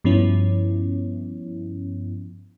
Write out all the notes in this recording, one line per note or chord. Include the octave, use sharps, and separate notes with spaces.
G2 F3 B3 C#4 E4